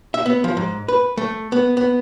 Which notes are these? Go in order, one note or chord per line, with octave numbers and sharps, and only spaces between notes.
E5
B3
F3
G#2
B4
A3
B3
B3